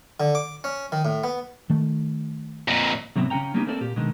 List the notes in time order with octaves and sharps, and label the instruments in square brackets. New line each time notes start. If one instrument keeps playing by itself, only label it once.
[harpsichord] D3
D6
C#4
D#3
A2
B3
[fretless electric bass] D#3 A3
[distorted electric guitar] F2 A#2
[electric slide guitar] G#2 C3 F#3 B3 C4
C#3 C#4 B4 F#5 G5 A#5
G3 A#3 B3 C#4 D#4 G4
A3 A#3 C4 A4 A#4 D5
A#2 G4
B2 D3 D#3 G#3